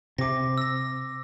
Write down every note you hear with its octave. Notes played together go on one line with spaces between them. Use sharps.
C3 D6 A#6
E6 A#6